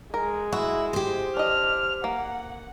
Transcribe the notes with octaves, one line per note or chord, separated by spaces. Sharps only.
G#3 A#4
E4 F#4
G4 C5
D4 D#5 F6
A#3 F#5